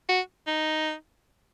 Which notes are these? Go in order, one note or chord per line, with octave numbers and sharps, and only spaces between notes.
F#4
D#4